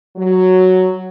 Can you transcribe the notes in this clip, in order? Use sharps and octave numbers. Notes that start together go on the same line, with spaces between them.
F#3